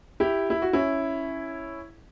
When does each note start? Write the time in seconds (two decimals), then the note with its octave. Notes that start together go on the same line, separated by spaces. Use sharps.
0.20 E4 G4
0.50 E4
0.62 F#4
0.73 C#4 E4